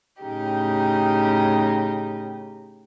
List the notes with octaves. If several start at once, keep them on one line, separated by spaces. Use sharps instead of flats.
A2 C#3 D#4 G4